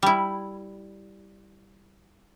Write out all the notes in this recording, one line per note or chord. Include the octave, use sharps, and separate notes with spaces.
G3 E4